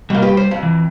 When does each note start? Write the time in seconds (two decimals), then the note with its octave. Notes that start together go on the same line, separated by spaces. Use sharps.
0.10 B2 G3 A#3 G5
0.22 G4 B4
0.37 C5
0.51 F2
0.63 E3